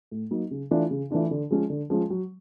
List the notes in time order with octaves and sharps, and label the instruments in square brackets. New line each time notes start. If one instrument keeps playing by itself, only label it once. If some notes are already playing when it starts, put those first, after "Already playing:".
[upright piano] A2
F#3 A#3 D#4
C#3
E3 A3 D4 F4
C#3
E3 A3 D4 F4
D3
F3 G#3 C#4
D3
F3 G#3 C#4
F#3